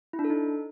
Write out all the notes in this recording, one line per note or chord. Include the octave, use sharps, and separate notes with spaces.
E4
D4
A4
D#4